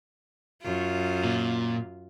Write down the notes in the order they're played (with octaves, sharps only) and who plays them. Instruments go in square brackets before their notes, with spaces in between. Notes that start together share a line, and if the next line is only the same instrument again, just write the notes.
[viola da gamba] F#2 F4
[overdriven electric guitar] A#2